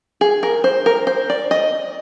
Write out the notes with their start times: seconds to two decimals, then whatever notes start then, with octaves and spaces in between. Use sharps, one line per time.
0.21 G#4
0.43 A#4
0.64 C5
0.86 A#4
1.07 C5
1.30 D5
1.51 D#5